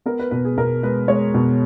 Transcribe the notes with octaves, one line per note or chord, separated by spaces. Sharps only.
B3 A#4
B4
B2 B4
G#4
B2 A#4
G#3 B4
G#3 C#5
B2